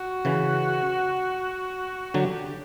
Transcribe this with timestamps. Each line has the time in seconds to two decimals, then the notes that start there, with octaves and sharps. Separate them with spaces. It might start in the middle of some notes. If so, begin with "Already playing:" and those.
Already playing: F#4
0.25 C#3 E3
2.14 D3 F#3 G4